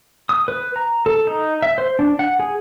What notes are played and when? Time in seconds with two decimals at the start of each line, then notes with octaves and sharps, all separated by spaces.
0.29 D#6
0.48 B4
0.76 A#5
1.06 A4
1.27 D#4
1.62 E5
1.78 C5
1.99 D4
2.19 F#5
2.39 G#4